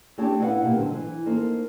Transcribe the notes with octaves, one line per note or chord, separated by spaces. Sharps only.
A3 C4 D4 G4 C#5 A5
E4 B4 C5 D#5 F5 F#5
B2 A#3 G4
D3 F#3 C5
E3
A#3 D#4 A4 C5